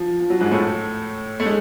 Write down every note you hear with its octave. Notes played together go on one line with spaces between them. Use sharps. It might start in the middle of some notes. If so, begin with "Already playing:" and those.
Already playing: F3
F3
F#3
G#2 G#3
A2 A3
A3
G#3